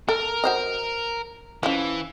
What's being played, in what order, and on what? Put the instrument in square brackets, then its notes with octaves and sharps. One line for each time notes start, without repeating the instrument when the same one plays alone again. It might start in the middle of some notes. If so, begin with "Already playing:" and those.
[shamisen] A4 [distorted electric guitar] A#4
[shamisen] F#4 C5 D#5
[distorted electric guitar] E3 [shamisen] F3 C#4